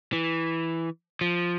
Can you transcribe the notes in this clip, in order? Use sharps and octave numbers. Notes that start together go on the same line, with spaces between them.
E3
F3